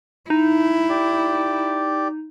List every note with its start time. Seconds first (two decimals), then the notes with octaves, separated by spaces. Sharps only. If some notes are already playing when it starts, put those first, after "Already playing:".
0.30 D#4 E4
0.89 G4 D5